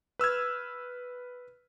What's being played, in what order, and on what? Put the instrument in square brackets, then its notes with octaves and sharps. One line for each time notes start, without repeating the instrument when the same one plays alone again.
[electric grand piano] B4 E6 F6 G#6